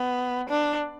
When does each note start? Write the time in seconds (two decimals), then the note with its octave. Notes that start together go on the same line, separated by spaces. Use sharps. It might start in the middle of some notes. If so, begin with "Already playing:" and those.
Already playing: B3
0.49 D4